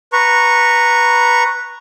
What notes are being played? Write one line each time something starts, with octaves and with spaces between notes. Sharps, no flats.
B4 A#5 C#6